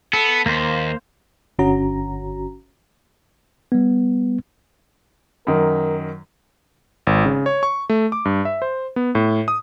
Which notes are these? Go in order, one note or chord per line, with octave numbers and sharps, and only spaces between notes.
B3 A4
D#2 A#3 C5
G1 D3 C#4 F#4 A#5
G3 B3
F#2 D#3 A#4
G#1
C#3
C#5
C#6
A3
D6
G2
E5
C5
B3
A2
D#6